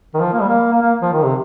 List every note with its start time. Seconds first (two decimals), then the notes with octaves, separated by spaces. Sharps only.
0.14 D#3
0.20 F3
0.33 A#3
0.41 G3
0.48 A#3
0.72 A#3
0.82 A#3
1.02 F3
1.12 D#3
1.23 C3